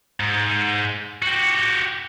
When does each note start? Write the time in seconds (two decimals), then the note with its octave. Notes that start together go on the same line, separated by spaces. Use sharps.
0.20 G#2
1.22 F#4 G4